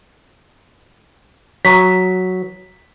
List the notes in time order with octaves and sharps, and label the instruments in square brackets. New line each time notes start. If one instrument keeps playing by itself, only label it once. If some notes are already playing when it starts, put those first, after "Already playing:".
[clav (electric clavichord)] F#3 [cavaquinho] A#5 C#6 D#6 [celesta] B6